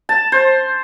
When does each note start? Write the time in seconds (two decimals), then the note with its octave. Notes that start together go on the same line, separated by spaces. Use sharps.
0.09 A5
0.32 C5